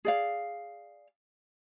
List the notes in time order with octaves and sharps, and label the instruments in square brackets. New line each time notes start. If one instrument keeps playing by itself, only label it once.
[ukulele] G#4 D5 F5